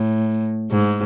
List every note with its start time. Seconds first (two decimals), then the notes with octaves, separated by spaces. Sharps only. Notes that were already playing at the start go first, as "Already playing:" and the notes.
Already playing: A2
0.71 G#2